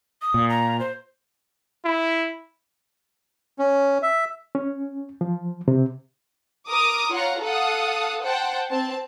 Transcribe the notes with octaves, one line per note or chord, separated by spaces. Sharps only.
D#6
A#2
A#5
C5
E4
C#4
E5
C#4
F3
C3
A#4 D6 D#6
F4 C#5 F#5 A#5
A4 F5 F#5 D#6
C5 F#5 G5 A5
C4 A5